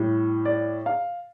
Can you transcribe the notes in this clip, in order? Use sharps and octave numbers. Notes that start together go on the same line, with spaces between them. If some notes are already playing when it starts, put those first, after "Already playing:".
Already playing: A2 G3
D5
F5